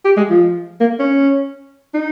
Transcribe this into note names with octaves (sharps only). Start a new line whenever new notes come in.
G4
G#3
F3
A#3
C#4
D#4